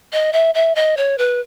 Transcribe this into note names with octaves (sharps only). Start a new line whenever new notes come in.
D#5
E5
E5
D#5
C#5
B4